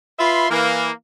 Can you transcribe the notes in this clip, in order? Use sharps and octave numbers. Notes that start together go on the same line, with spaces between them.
F4 B4 E5 B5 C6
E3 A#3